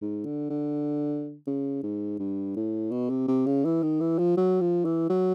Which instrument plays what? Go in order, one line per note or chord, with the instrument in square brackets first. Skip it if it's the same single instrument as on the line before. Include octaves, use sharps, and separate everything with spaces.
[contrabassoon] G#2
D3
D3
C#3
G#2
G2
A2
B2
C3
C3
C#3
E3
D#3
E3
F3
F#3
F3
E3
F#3